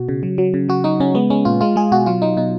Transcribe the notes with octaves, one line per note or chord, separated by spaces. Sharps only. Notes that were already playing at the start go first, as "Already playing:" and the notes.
Already playing: B2 F#4
C#3
F#3
F#3
C#3
F#3 F#4
F#3 D#4
C#3 C#4
G#3 B3
G#3 C#4
A#2 F4
G#3 F4
G#3 G#4
B2 F#4
F#3 F4
F#3 D#4
B2 D#4